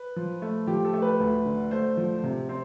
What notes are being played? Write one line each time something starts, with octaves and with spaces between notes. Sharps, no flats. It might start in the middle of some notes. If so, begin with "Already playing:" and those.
Already playing: B4
F3
A3
F3 G4
A4
A3
B4
D2
D3
A3 C5
F3
C3
C4